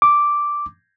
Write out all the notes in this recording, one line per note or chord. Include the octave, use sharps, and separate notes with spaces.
D6